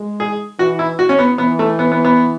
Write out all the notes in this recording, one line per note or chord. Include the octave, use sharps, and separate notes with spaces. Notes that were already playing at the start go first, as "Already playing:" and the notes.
Already playing: G#3
G#4
E3 F#4
E4
F#4
C#4
B3
E3 B3
A3
B3
B3
B3